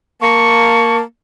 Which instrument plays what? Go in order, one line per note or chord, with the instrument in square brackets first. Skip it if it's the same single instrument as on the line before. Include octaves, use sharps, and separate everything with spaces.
[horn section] A#3 [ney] A5 [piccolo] C#6